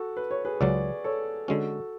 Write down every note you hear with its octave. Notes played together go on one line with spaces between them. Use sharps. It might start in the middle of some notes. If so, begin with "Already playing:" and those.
Already playing: F#4 A4
B4
C#5
G#4 B4
C#2 C#3 F#3 B4 D5
A4 C#5
D3 G#3 C#4 F#4 A4